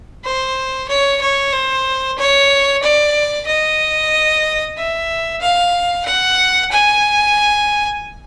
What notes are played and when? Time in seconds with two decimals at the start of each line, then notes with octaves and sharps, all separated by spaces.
0.24 C5
0.88 C#5
1.21 C#5
1.53 C5
2.18 C#5
2.83 D5
3.47 D#5
4.77 E5
5.41 F5
6.05 F#5
6.71 G#5